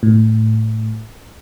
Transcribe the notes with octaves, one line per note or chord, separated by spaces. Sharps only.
A2